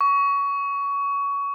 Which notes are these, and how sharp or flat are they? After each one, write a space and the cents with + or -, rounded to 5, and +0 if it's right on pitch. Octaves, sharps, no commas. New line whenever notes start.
C#6 +20